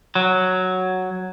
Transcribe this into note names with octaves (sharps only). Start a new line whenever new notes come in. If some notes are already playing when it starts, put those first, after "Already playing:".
F#3